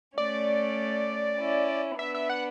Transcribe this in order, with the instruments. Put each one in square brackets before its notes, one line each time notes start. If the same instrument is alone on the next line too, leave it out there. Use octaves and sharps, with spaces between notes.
[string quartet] A3 C#4 [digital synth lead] D5
[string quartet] C#4 E4
[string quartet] B3 D4 [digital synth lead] E5
[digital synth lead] E5
F#5